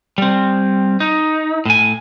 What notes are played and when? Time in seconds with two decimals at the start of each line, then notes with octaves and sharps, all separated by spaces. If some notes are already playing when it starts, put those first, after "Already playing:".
0.18 G3 C4
1.00 D#4
1.66 A2 G#5